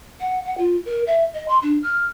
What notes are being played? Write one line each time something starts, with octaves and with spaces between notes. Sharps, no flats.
F#5
F#5
F4
A#4
E5
D#5
C6
D4
F6